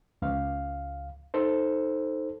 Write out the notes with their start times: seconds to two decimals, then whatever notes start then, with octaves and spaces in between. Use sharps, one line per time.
0.22 C#2 F5
1.34 D#4 A4 C5